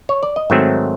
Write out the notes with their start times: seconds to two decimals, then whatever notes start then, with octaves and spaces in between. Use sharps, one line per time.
0.09 C#5
0.23 D5
0.36 D#5
0.50 G#2 D#3 F#3 A3 C4 E5